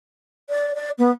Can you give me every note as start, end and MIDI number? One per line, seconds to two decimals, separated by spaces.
0.50 0.72 74
0.75 0.90 74
0.98 1.11 59